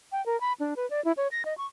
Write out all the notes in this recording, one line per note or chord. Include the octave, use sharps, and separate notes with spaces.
G5
A#4
B5
D4
B4
D5
E4
C#5
A#6
D#5
C#6